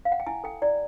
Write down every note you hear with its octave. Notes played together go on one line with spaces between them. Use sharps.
F5
F#5
G5
E4 G#5
A4 G5
E4 D5